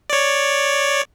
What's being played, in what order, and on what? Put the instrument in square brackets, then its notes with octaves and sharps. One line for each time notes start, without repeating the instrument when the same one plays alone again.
[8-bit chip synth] C#5 D5